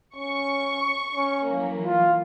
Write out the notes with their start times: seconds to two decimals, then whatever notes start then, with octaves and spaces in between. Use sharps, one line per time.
0.16 C#4 C#6
1.14 C#4
1.44 E3 F#3 A#3
1.85 F4